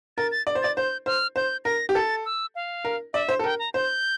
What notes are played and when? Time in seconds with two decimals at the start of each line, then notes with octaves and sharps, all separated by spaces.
0.17 A#4 A6
0.31 A6
0.47 D5
0.55 C5
0.62 D5 A6
0.77 C5 G6
1.06 C5 F6
1.36 C5 G6
1.65 A#4 A#6
1.89 G4
1.95 A4 A6
2.25 E6
2.55 F5
2.85 A#4
3.14 D5 E5
3.29 C5
3.39 A4
3.44 A#4 G5
3.59 A#5
3.74 C5 G6